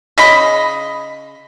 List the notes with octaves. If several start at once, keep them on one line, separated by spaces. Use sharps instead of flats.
C#3 D#5 B5